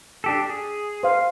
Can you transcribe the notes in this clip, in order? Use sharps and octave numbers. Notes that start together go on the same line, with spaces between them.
D4 G4 A4
G#4
C5 F5